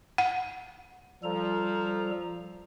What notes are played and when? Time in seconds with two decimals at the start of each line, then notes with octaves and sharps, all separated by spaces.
0.18 F#5
1.24 F3 G3 A4 A#5